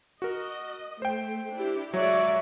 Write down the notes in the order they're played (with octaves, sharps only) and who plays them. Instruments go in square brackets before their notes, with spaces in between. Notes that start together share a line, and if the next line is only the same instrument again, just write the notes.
[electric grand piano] F#4 A#4 [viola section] D#5
[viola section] A3 [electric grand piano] C5 G5
[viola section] D4 E4 G4
[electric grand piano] F#3 [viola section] G#3 F#4 D5 [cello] C#5 E5